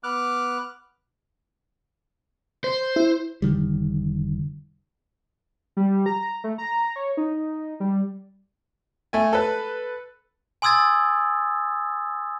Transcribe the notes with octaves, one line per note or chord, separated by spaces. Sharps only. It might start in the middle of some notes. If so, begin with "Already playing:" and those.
B3 D6 F6 F#6
C5
E4
F1 D3 D#3 G3
G3
A#5
A3
A#5
C#5
D#4
G3
A3 G#5
A4 B4
G#5 C6 D#6 E6 G#6 A6